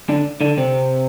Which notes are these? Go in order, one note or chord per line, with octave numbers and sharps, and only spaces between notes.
D3 D4
D3 D4
C3 C4